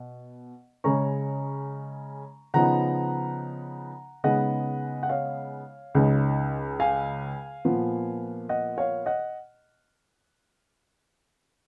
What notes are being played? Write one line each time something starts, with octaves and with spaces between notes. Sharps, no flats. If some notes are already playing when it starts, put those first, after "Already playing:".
Already playing: B2
C#3 G#3 C#4 A#5 C#6
C#3 F3 B3 D#4 F#5 A#5
C#3 G#3 B3 D#4 D#5 F#5
F#5
C#5 F5
C#2 C#3 G#3 D#4
F5 G#5
A#2 F3 B3
D#5 F#5
C#5 F5
D#5 F#5